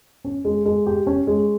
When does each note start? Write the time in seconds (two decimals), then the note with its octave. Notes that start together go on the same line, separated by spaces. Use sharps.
0.25 C#4
0.45 G#3
0.65 G#3
0.86 G4
1.07 C#4
1.27 G#3